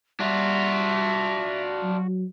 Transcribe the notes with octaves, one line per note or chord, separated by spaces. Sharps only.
G3 D4 F4 F#4 E5
F#3